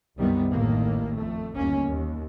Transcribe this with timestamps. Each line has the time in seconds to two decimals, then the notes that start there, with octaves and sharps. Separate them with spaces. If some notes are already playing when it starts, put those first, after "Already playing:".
0.17 C2 F#2 C3 D#3 G3 B3
0.52 A1 D#2 A2 D#3 A#3
1.15 F2 A3
1.55 G1 D#2 A#3 C#4
1.86 D#2